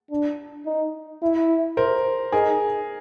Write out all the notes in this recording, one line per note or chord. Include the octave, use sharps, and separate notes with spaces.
D4
D#4
E4
A#4 C5
D#4 G#4 A#4